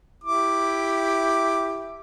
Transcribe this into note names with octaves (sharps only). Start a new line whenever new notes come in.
E4 G4 D6